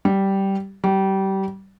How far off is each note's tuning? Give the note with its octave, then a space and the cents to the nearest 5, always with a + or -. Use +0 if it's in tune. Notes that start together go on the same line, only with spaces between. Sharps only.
G3 -10
G3 -25